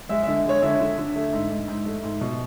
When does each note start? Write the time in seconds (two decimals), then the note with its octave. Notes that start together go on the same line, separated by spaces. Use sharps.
0.09 G#3 E5
0.23 D3 E5
0.46 G#3 C#5
0.62 D3 E5
0.80 D3
0.98 D3
1.16 A3
1.33 G#2
1.51 G#2
1.68 G#2
1.86 A3
2.03 G#2
2.21 B2